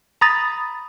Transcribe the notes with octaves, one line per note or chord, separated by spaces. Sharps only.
A#5 B5 D#6 A6